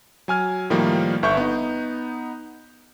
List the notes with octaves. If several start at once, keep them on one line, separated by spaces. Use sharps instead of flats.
F#3 G#5 F6 G#6
A2 D#3 F3 G3 A#3
G1 E5 C#6 G6
B3 D#4